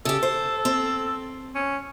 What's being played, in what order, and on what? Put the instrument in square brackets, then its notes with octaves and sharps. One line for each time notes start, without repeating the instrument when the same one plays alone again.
[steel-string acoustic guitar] C#3 G4 [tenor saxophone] A4
[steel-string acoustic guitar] C5
C4
[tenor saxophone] C#4